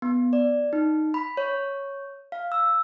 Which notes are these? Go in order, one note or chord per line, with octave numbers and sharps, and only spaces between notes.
B3
D5
D#4
B5
C#5
F5
E6